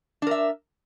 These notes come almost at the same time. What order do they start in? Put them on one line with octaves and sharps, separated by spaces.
D4 A#4 E5